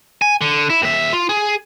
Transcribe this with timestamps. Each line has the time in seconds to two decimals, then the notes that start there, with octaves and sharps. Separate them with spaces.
0.22 G#5
0.41 D3
0.70 E4
0.82 D#2 E5
1.13 F4
1.29 G#4